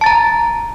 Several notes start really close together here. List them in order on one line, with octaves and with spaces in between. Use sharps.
A5 A6 A#5